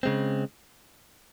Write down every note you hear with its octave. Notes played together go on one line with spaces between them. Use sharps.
C#3 G#3 C4